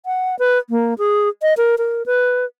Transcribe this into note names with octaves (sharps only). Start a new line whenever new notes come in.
F#5
B4
A#3
G#4
D#5
A#4
A#4
B4